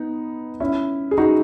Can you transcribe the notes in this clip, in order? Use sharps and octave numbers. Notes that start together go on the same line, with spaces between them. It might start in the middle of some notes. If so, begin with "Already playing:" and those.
Already playing: B3 D#4
C#4 E4
G#4
D#4 F#4